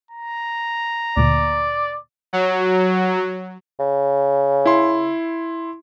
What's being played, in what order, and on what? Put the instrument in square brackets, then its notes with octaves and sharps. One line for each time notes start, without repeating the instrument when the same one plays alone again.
[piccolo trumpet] A#5
[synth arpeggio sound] D2 A#2 [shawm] D5
[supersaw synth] F#3
[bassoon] C#3
[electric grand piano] E4 C6